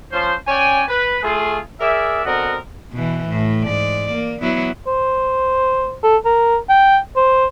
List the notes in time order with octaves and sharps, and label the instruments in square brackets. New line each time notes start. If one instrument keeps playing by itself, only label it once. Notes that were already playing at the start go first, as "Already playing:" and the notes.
[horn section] F3 C#4 F4 C5
C#4 C#5 D5 G5 G#5
B4
A3 F4 G#4
G#4 A#4 D5 E5
B2 D3 C4 A#4 D#5 F#5
[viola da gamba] B2 E3
A2
G#2 D5
A#3
F#3 B3 E4
[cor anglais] C5
A4
A#4
G5
C5